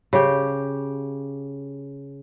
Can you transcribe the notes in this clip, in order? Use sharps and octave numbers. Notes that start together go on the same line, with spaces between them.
C#3 G4